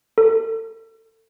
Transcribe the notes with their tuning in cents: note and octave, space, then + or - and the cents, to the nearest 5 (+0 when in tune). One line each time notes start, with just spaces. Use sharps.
A4 +30